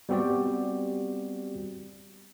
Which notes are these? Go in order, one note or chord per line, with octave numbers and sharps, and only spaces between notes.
G3 B3 C4 F#4 G4 D5